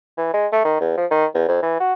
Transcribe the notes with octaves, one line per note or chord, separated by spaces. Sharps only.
E3
G#3
A3
D#3
E2
F3
D#3
E2
F2
E3
F#4